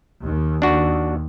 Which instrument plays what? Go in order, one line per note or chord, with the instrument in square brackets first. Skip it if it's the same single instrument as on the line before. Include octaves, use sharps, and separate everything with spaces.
[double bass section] D#2
[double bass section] D#2 [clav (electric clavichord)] D4 F#4